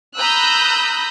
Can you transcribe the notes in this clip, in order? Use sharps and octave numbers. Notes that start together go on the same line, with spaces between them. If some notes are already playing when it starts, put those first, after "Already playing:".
A#5 B5 D#6 E6 F#6 G6